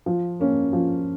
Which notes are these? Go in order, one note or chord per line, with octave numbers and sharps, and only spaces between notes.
F3
A#3 C#4
F3